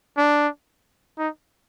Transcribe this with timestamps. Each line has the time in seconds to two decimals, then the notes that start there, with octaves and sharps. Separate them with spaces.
0.17 D4
1.18 D#4